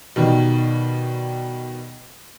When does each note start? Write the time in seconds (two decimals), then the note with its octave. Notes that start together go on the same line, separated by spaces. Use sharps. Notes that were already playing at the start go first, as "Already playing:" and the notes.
0.16 B2 D#3 G3